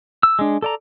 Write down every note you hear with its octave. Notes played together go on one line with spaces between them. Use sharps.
E6
G#3 D4
A4 D5 A#5